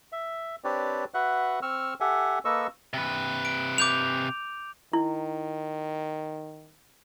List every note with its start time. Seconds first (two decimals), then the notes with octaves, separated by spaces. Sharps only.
0.12 E5
0.64 C4 D4 G4 B4 C#5 D5
1.14 F#4 B4 E5 F#5 F#6
1.62 C4 C#6 E6 F6
2.00 G4 A4 E5 F#5 G#5
2.45 A#3 A4 B4 D#5 C#6 E6
2.93 C3 B4
3.45 D7
3.78 D6 G6 F7
4.93 D#3 E4